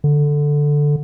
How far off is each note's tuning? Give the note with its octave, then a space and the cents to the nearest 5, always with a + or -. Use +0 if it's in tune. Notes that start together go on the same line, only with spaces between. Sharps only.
D3 +0